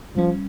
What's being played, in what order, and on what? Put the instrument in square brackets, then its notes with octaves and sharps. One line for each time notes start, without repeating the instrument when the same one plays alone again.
[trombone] F3 [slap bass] G3 C#4